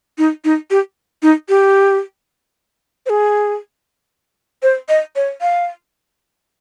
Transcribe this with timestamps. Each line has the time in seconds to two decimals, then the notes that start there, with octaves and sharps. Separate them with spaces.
0.18 D#4
0.45 D#4
0.71 G4
1.23 D#4
1.49 G4
3.06 C5
3.10 G#4
4.63 C5
4.89 D#5
5.16 C#5
5.41 F5